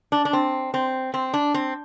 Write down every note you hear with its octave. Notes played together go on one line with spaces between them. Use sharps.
D4
D4
C4
C4
C4
D4
C4